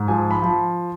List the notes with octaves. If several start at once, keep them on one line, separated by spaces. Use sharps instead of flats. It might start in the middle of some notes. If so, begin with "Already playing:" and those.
Already playing: G#2
F3 G#5
B5
F3